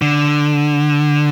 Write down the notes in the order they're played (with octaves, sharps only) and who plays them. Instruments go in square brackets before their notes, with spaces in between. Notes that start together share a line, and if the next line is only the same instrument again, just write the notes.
[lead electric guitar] D3